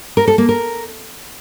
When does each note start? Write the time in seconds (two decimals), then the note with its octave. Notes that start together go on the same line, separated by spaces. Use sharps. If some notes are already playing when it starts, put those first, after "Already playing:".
0.17 A#4
0.28 A4
0.38 A#3
0.49 A#4